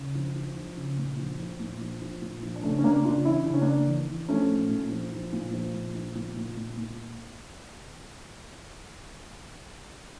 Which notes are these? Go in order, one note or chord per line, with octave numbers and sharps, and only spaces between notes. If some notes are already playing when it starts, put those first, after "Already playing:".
Already playing: C#3
F3
F3
F3
C#3
A#2
F3
F3
A#2
F3
F3
A#2
F3
D4
C#3 A3 C#4
C#4
C#3 A#3 D4
C#3 D4 F4
E3 C#4 E4
C#3 D4
C#4
C#3 A#3 D4
E3
E3
F3 A3 C#4
A#2
A#2
F3
F3
A#2
F3
A#2
F3
A#2
A#2
A#2
A#2